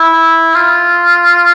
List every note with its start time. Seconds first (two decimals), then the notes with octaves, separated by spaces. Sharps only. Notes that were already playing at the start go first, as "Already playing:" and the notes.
Already playing: E4
0.54 F4